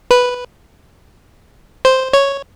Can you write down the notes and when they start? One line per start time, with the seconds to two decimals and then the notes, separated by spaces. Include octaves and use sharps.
0.11 B4
1.85 C5
2.13 C#5